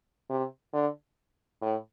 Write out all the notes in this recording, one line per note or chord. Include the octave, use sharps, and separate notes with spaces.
C3
D3
A2